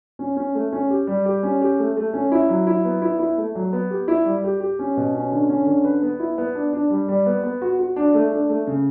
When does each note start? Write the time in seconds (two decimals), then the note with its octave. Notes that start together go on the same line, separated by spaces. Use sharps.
0.19 C#4
0.37 C#4
0.55 A3
0.72 C#4
0.90 G4
1.07 G3
1.25 G4
1.43 C#4
1.61 G4
1.79 A3
1.97 A3
2.13 C#4
2.32 E4
2.49 F#3
2.67 E4
2.85 B3
3.02 E4
3.19 E4
3.38 A3
3.55 F#3
3.73 B3
3.91 G4
4.08 E4
4.25 G3
4.44 G4
4.60 G4
4.79 C#4
4.97 B2
5.14 C#4
5.32 D3
5.49 C#4
5.67 D3
5.84 B4
6.02 B3
6.20 E4
6.38 B3
6.55 D4
6.73 D4
6.90 G3
7.08 G3
7.26 B3
7.43 B3
7.62 F#4
7.79 F#4
7.96 D4
8.14 A3
8.32 D4
8.49 A3
8.67 C#3